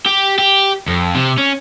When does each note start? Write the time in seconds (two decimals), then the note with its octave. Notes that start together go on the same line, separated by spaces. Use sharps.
0.06 G4
0.38 G4
0.88 F2
1.15 C3
1.38 C#4